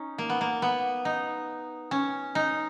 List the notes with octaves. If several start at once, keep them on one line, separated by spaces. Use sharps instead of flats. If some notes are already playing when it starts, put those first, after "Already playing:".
Already playing: C#4 D#4
A#3
B3
A#3
B3
D#4
C#4
D#4